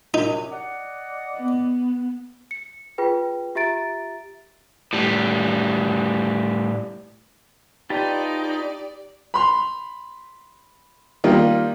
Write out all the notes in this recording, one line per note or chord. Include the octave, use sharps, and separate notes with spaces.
F#2 C3 D#4
D5 D#5 F#5
B3
C#7
F4 G#4 B4 G5
F4 G4 E5 A#5 A6 D7
A2 G3
D#4 F4 G4 B4 D5 A5
B5 C6 F7
D#3 G3 A#3 F4